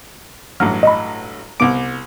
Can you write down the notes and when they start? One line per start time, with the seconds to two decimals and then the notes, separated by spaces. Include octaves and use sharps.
0.60 A1 G2 F#3 F6
0.83 D#5 B5
1.60 C2 B3 D6 D7